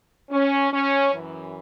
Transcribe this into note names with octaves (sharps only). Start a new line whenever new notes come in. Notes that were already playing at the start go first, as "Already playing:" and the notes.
C#4
C#4
F#2 E3